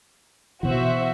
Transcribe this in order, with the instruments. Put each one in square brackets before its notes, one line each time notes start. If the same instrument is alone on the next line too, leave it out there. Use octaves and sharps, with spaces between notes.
[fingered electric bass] B2 E3 [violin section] F#4 C5 E5